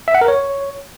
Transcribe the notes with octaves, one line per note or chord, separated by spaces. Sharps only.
E5
F#5
A#4
C#5